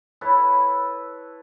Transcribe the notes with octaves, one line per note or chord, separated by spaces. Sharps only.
E4 A4 B4 C#5